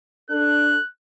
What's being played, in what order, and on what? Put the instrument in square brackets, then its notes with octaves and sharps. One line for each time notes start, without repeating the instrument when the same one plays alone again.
[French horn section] D4 A4 [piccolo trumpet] F#6